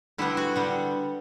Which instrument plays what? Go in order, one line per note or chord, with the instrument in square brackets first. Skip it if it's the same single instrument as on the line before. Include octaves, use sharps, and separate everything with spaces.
[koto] D3 G3 B3 E4
F#4
D3 G3 B3